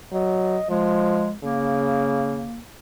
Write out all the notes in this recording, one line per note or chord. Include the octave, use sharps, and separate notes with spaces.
F#3 D#5
F3 G#3
C#3 A#3